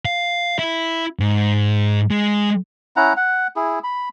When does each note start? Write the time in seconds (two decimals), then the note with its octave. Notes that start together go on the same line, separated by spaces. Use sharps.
0.05 F5
0.59 E4
1.20 G#2
2.11 G#3
2.96 C#4 E4 F#5 A#5
3.17 F#5
3.56 E4 G#4
3.84 B5